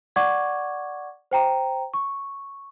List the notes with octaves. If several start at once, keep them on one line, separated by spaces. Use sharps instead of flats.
D5 F#5 C#6 D6 G#6
C5 G5 A#5
C#6